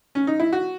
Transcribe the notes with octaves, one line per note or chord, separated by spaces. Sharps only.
C#4
D#4
E4
F#4